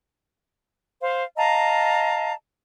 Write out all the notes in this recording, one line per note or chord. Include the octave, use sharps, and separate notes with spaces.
C5 F5
D#5 F5 A5 A#5